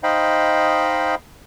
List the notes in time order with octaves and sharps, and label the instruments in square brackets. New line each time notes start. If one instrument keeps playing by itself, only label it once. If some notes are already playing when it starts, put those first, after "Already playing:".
[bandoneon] D#4 C5 D#5 F5 G5 B5